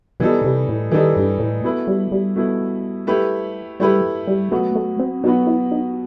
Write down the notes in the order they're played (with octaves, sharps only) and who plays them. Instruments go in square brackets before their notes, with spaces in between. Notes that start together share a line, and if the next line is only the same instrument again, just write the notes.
[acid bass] B2 [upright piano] E3 G3 D#4 A4
[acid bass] C3
A2
[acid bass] D#3 [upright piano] E3 G3 D#4 A4
[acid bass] G2
A2
[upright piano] B2 A3 E4 B4
[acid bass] G3
G3
[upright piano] B2 A3 E4 B4
A3 E4 G4 B4
[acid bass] G3 [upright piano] A3 E4 G4 B4
[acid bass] G3
[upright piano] B2 F#3 B3 F#4 B4 [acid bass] A3
[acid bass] A3
C4
[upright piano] B2 F#3 B3 F#4 B4 [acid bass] D#4
[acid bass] E4
D#4